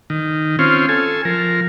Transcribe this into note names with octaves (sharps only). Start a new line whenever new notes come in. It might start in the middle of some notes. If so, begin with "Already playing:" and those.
D#3
C4 C#4 F4
A4 G#5
F3 A#4